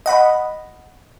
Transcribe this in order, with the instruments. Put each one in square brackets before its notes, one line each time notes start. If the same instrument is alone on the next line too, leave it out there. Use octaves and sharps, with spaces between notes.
[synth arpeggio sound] D#5 F#5 B5